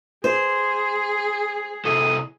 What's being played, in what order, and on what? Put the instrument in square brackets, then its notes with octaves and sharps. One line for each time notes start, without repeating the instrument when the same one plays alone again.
[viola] G#4 [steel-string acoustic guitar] C5
[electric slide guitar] C3 E4 A4 [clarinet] D#6